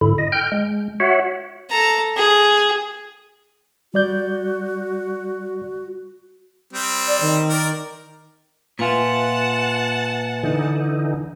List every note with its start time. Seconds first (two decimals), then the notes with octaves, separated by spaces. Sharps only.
0.01 G#2 D3 E4
0.18 D#5
0.32 G5 F6 G6
0.52 G#3
1.00 F#4 C#5 E5 F#5
1.70 A4 A#5
2.16 G#4
3.94 G3 F#4 D5 G6
6.73 G3 C4
7.07 D5
7.21 D#3
7.50 A#4 D5
8.79 A#2 F4 B4 E5 F#5 G#5 A5
10.44 D3 E3 D#4